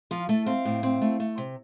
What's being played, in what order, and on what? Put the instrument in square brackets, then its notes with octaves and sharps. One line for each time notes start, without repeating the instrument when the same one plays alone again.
[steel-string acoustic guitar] F3 F4
A3 A4
C4 F5
A2
C4
A3
A3
C3